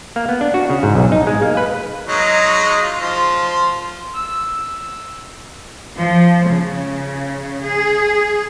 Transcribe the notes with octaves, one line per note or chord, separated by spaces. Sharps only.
A#3
B3
D4
F#4
C#3
G#2
B1
D#4
G#3
A#3
B4
F#3 G#3 D#4
F4
F3 C6
E6
F3
C#3
G#4